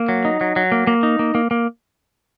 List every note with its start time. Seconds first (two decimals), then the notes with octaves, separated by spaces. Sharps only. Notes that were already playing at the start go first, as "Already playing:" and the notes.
Already playing: A#3
0.09 F#3
0.25 D#4
0.41 F#3
0.56 F#3
0.72 A#3
0.87 A#3
1.03 D#4
1.19 A#3
1.35 A#3
1.51 A#3